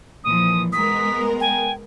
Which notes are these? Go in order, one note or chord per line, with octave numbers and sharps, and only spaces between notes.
A#2 E3 F3 D#6
G#3 B3 A#4 D#6 B6
G5 G#5